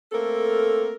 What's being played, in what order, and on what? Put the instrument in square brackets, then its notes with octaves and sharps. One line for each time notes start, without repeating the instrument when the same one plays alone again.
[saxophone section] A3 A#3 C4 A4 A#4